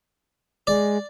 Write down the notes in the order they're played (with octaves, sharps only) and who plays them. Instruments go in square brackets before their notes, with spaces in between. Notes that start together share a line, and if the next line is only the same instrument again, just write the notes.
[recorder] G#3 [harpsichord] D5